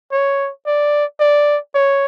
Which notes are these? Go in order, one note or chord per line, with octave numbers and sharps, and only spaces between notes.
C#5
D5
D5
C#5